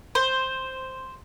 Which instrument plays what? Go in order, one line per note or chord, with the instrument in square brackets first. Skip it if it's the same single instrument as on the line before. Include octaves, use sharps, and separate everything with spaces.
[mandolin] C5